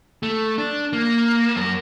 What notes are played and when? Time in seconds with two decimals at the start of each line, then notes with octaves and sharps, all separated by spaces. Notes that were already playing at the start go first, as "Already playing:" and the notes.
0.23 A3
0.58 D4
0.93 A#3
1.56 F#2 A#4